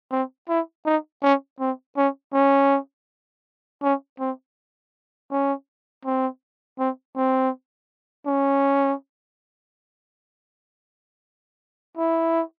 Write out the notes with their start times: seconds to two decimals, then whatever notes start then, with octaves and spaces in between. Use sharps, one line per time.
0.11 C4
0.49 E4
0.85 D#4
1.22 C#4
1.60 C4
1.97 C#4
2.33 C#4
3.83 C#4
4.20 C4
5.31 C#4
6.05 C4
6.79 C4
7.16 C4
8.26 C#4
11.97 E4